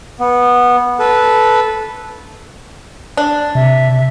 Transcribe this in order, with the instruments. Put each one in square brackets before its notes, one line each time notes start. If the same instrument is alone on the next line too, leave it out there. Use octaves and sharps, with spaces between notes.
[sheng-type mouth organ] B3
A4 B4
[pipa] D4
[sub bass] C3 [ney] E5